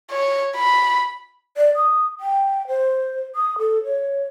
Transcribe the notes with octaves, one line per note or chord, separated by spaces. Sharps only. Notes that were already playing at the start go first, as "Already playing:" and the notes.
C#5
B5
D5
D#6
G5
C5
D#6
A4
C#5